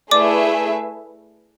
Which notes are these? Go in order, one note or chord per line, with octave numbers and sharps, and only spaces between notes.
A3 E4 G#4 B4 D5 E5 D6